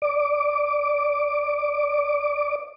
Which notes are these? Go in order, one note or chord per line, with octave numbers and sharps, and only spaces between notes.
D5 D6